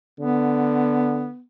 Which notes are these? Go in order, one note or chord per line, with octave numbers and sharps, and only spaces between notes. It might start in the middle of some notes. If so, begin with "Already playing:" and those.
D3 B3